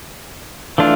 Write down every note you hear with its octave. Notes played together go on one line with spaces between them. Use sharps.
E3 A3 D4 F4